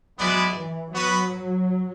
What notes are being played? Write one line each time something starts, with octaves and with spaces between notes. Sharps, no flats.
F#3 G#3 B3 E4 B4 D5
E3
F#3 B3 F#4 B4